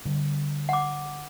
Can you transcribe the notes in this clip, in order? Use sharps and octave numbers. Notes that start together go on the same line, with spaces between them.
D3 G3
F#5 D6